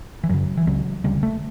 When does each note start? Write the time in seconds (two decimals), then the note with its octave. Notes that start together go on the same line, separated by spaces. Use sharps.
0.24 E3
0.29 F#2 C#3 F#3
0.57 E3
0.67 C#2 C#3 F#3
1.04 D2 C#3 G3
1.23 A3